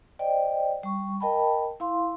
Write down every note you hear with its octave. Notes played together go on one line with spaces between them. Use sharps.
C5 D5 D#5 G5
G3 C#6
A#4 D#5 G5 A5 B5
E4 F5 C6